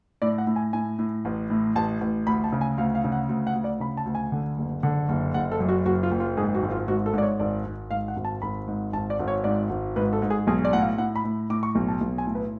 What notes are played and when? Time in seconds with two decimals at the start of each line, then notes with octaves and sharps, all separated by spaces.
0.22 A2 D5
0.38 F#5
0.47 A2
0.56 G#5
0.73 A2 G#5
0.99 A2
1.25 A1
1.50 A2
1.75 A1 A5
2.01 A1
2.27 D2 B5
2.44 A5
2.52 C#3
2.61 G#5
2.78 D2 F5
2.95 F5
3.04 C#3
3.12 F#5
3.29 D2
3.47 F#5
3.55 D2
3.64 D5
3.80 C#3 B5
3.97 A5
4.06 D2
4.15 G#5
4.32 D3
4.58 F#1
4.83 D3
5.09 F#1
5.34 F#1 F#5
5.52 A4
5.60 F#2
5.69 F#4
5.86 F#1 F#4
6.03 F4
6.11 F#1
6.20 F4
6.37 G#2 G#4
6.54 F#4
6.62 G#1
6.71 F4
6.88 G#2 F#4
7.06 A4
7.14 G#2 D5
7.22 C#5
7.39 G#1 D5
7.65 G#1
7.91 G#2 F5
8.08 F#5
8.16 G#1
8.25 A5
8.42 G#1 B5
8.68 G#2
8.93 G#1 A5
9.10 D5
9.19 G#1
9.28 C#5
9.44 G#2 D5
9.70 G#1
9.96 G#2 B4
10.13 A4
10.22 G#2
10.30 G#4
10.47 B1 G#4
10.65 D5
10.73 A2 F#5
10.81 F5
10.98 A2 F#5
11.16 B5
11.24 A2
11.50 A2 D6
11.63 C#6
11.75 B1
11.88 A5
12.01 B1
12.18 G#5
12.27 A2
12.35 B4